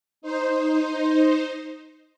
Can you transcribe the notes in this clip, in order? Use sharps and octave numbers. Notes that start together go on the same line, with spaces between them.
D#4 C5